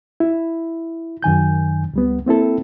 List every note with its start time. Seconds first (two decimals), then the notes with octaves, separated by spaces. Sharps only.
0.20 E4
1.23 F#2 D#3 G#5 G6
1.94 C#2 G3 B3
2.26 A#3 C4 E4 A4